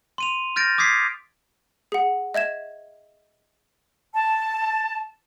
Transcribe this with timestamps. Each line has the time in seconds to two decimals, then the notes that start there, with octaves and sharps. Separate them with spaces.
0.18 C6 D#7 F7
0.56 F6 G6 A6 A#6 D7
0.78 D6 D#6 G#6 B6 C7
1.92 G#4 F#5
2.34 D#5 E5 G#6 E7
4.14 A5